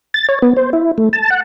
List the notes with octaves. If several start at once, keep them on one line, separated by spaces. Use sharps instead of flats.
A6
C#5
B3
C5
E4
A3
A5
F#5